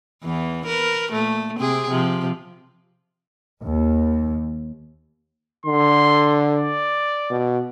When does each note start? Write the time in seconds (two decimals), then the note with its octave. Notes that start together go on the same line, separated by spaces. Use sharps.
0.23 E2 E3
0.66 A#4 B4
1.12 A#2 A3
1.58 C3 C4 G#4
1.89 C3 F3
3.65 D#2
5.66 D3 C6
6.51 D5
7.30 B2